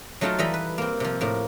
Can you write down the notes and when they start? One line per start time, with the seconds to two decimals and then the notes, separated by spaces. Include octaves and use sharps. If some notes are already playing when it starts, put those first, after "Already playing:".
0.21 F#3 A3 D#4 F4 G5 A5
0.38 E3 G3 A4 D#5 A#5 B5
0.54 B4
0.78 A#3 C4
1.00 C3 F3
1.21 A2 A#3